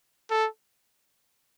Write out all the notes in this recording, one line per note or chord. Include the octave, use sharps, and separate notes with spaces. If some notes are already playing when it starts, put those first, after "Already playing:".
A4